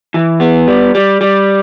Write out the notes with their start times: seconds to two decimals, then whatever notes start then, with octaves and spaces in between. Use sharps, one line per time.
0.14 E3
0.40 B3
0.68 G3
0.95 G3
1.21 G3